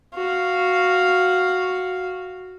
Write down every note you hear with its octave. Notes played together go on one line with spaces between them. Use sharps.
F#4 F5